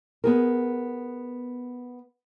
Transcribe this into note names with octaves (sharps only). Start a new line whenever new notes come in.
B3 G#4 A#4